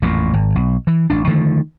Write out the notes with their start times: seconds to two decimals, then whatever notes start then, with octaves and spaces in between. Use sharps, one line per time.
0.02 A1 F2 A#2
0.33 G#1
0.55 B1
0.87 E3
1.10 A1 D4
1.27 D3 D#3 F3 A3